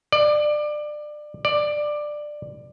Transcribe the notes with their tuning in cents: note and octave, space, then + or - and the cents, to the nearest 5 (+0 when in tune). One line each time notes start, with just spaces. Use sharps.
D5 +25
D5 +15